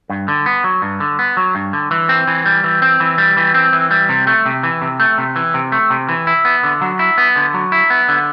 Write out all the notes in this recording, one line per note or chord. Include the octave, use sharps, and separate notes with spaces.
G2
D3
B3
F#3
G2
D3
B3
F#3
G2
D3
E3
C4
E3
G3
E3
C4
E3
G3
E3
C4
E3
G3
C3
A3
C3
E3
C3
A3
C3
E3
C3
A3
C3
E3
E4
B3
D3
F#3
E4
B3
D3
F#3
E4
B3
D3